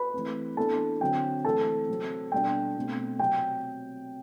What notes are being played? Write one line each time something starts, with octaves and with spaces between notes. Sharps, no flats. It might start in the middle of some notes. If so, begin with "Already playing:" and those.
Already playing: B4 B5
E3 A3 C4
E3 B3 D4 A4 A5
D3 F#3 C4 G5
C3 E3 A3 C4 A4 A5
C3 F#3 C4
B2 G3 B3 D4 G5
B2 A3 C4
C3 F#3 C4 G5